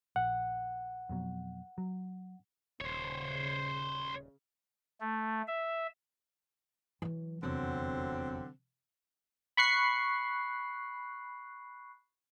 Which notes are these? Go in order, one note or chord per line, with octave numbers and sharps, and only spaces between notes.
A#1 F#5
F2 B2 F#3
F#3
D#1 C#3 C5 C#5
A3
E5
E3 F#3
F1 E2 D3 F#3 C4
B5 C#6 F#6 C7